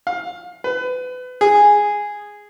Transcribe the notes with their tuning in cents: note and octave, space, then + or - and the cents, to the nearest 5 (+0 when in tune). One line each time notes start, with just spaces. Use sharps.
F5 +25
B4 +30
G#4 -5